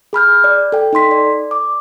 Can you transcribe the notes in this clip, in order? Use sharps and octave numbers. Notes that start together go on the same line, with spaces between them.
G#4 B5 F6 G6
D5
A4 G5
D#4 A4 C6 B6
D5
D6